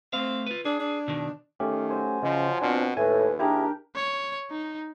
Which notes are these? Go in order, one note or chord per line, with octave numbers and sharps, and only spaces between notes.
A3 C4 F5
F4 B4
D4 G#4
D4
B2 D#3
D#3 A3 C#4 G4
F#3 C5 G#5
C#3 F3 D#5
B2 C4 D4 F4 F5
D#2 A2 B4 G#5
D4 E4 G4 G#4 A#4
C#5
D#4